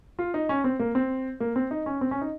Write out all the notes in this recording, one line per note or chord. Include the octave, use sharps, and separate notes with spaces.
F4
D#4
C#4
C4
A#3
C4
A#3
C4
D#4
C#4
C4
C#4
D#4